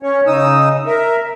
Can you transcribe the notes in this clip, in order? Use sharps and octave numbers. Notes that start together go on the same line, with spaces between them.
C#4 C#5
C#3 D#4 D#6 E6
A#4 E5